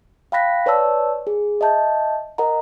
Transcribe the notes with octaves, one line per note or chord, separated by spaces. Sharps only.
F5 G5 B5 F#6 A#6 B6
B4 C#5 D5 A5 E6
G#4
D#5 E5 A5 G6
A#4 D#5 F#5 A#5